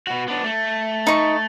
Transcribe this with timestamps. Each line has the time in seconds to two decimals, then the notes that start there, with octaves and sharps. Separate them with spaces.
0.07 B2 F#4
0.28 B3 D4
0.44 A3
1.07 D#4 C#6